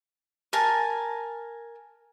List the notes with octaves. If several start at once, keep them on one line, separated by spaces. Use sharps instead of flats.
A#4 G#5 A5